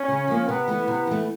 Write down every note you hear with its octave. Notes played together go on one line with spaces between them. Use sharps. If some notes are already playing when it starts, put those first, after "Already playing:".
Already playing: C#4
C#3
F3 A#3
C3 B3
E3 A3
C3
E3 A3